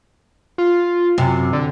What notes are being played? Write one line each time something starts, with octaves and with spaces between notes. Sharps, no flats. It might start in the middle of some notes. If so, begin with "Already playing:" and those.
F4
F#2 C3
D3